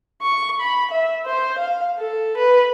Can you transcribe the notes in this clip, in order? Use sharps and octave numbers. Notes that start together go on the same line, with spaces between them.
C#6
B5
E5
C5
F5
A4
B4